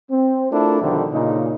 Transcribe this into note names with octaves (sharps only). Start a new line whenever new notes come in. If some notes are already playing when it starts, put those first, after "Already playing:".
C4
A3 D4 E4 F4 A4 A#4
B1 D3 D#3 F3 G3 D4
A#2 C#3 D#4